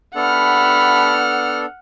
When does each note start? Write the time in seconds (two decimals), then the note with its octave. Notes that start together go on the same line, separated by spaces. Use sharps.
0.15 B3 D4 G4 A4 E5 F#5 B5 F6